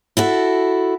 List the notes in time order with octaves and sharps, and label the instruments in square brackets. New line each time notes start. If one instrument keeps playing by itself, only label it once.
[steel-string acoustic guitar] E4 F#4 A4